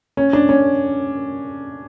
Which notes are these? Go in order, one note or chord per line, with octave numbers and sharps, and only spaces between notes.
C#4
D4
C#4